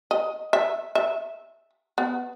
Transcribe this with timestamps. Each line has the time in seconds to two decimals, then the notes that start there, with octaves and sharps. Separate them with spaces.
0.11 D#5
0.53 E5
0.95 E5
1.98 B3